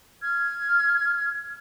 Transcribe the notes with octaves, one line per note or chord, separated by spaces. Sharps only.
F6 G#6